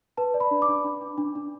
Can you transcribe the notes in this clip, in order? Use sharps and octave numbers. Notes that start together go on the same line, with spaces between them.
B4 A5
D5
B5
D4
D6
D4
D4
D4
D4
D4